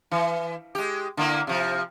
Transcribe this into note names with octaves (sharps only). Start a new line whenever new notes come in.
E3
G#3 G4
D3 A#3 E4
C3 F3